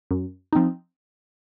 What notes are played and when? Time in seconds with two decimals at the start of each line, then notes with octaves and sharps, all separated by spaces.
0.11 F#2
0.53 F3 C4 D#4